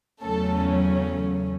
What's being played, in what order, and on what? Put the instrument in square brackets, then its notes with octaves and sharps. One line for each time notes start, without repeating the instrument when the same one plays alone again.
[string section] E2 C#3 F#3 A3 C#4 A4